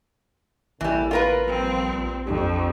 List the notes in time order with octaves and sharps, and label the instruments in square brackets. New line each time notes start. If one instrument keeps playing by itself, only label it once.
[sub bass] A1 [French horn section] A2 A#3 [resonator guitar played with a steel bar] E3 G3
[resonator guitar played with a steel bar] F4 A#4 B4
[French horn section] A#2 F3 G3 [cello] C4
[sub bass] A#1
[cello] F2 [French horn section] D4 G4